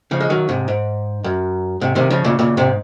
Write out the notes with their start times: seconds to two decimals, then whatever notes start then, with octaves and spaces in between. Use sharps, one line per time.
0.11 C#3 F3
0.20 G#3
0.30 D#3 F#3
0.49 G#2 C3
0.68 G#2
1.24 F#2
1.81 G#2 C3
1.95 C3 D#3
2.10 C#3 F3
2.24 A#2 C#3
2.39 A#2 C#3
2.57 G#2 C3